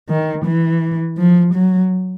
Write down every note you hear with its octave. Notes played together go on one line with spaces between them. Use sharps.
D#3
E3
F3
F#3